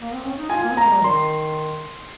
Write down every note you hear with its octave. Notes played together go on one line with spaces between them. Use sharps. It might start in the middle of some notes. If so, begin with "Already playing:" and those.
A#3
C4
C#4
D#4
F4 G#5
A#3
C4
A#3 A#5
G#3
G3
D#3 C6